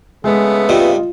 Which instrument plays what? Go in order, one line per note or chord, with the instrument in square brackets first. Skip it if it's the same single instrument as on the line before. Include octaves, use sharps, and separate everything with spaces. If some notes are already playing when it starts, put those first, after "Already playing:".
[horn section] C#3 A3 B3 [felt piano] G#3
[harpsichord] G2 C3 [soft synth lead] F4 [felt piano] D#5